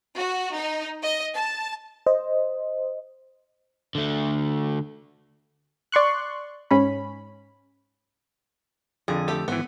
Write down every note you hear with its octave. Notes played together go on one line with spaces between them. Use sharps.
F#4
D#4
D#5
A5
C5 D#5
D3 A3
D5 C6 C#6 F#6
G#2 C#4 B5
F2 D3 G#4
A3 G4
G#1 E3 B3